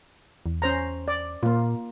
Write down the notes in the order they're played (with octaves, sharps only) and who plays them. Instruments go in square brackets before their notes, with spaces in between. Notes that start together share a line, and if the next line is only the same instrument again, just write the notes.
[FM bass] E2
[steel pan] C#4 C5 A#5
D5
[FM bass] A#2 [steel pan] A#3 F4